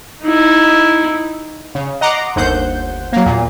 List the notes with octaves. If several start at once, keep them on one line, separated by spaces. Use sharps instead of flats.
D#4 E4
C#3
D#5 F#5 A#5 C6 D6
G1 D#2 C5 F#5 G6
F#3 A#3
E2 A#2